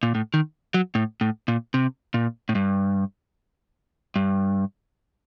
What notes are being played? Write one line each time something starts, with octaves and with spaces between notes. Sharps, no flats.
A#2
A2
D#3
F#3
A2
A2
A#2
C3
A#2
A2
G2
G2